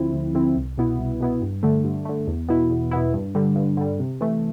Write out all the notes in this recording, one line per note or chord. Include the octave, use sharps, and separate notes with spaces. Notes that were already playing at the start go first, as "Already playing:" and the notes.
Already playing: D2 D3 F3 C4 E4
D2
D3 F3 C4 E4
C2
B2 B3 E4
C2
B2 B3 E4
G2
D3 A3
G2
D3 A3
E2
B2 B3 E4
E2
B2 B3 E4
G2
D3 G3
G2
D3 G3
C3
E3 A3